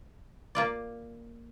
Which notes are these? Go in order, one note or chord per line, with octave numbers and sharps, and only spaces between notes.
A#3 F4 D5